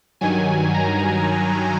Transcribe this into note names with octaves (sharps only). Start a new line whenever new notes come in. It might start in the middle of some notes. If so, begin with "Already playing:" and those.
G2 D#3 F#3 G#5
A#5